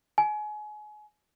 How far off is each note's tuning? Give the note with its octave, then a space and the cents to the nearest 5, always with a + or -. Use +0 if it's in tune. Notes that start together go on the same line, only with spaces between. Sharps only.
G#5 +30